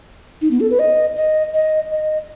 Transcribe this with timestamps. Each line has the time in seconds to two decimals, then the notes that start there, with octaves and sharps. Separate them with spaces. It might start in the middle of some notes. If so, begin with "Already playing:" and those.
0.42 D#4
0.51 B3
0.60 A4
0.71 B4
0.79 D#5
1.17 D#5
1.54 D#5
1.92 D#5